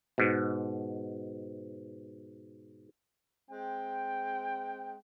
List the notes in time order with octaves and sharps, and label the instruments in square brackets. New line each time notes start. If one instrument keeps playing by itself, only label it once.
[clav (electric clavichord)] G#2 B2
[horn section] G#3 C4 G5